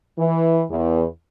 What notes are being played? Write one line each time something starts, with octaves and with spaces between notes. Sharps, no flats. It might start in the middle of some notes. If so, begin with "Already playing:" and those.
E3
E2